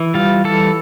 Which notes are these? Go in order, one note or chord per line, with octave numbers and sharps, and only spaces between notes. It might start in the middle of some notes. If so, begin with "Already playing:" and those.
Already playing: E3
G3 F4
E3 A4